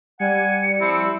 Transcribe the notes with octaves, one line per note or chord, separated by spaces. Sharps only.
G3 F#5 G#5 C#7
F3 C4 E4